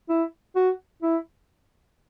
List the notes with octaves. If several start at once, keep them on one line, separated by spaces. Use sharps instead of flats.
E4
F#4
E4